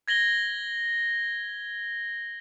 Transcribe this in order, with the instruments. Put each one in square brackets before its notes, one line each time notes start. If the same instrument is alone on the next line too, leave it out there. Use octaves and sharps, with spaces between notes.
[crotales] G#6 A#6 F#7 G7